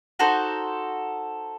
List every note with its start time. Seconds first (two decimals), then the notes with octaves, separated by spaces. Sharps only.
0.19 D#4 F#4 A4 C5